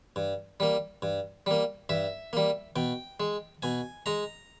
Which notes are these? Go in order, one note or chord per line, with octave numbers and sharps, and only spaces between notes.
G2
G3 A#3
G2
G3 A#3
G2 E5
G3 A#3
B2 G5
G#3
B2 G#5
G#3 A#5